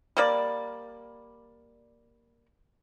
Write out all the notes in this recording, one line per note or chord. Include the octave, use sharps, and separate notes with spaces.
G3 A#3 D5